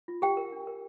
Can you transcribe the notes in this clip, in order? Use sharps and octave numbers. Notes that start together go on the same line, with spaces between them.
F4
G4 A#4 G5
A#4
D4
A#4